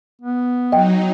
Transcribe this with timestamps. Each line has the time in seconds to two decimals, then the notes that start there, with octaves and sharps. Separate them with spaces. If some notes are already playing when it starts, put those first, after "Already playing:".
0.22 B3
0.72 F#3 D#4 D#5 G5